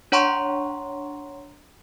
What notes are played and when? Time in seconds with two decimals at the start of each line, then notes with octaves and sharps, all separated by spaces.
0.12 D4 C#5 F#5 A#5 C6 C#6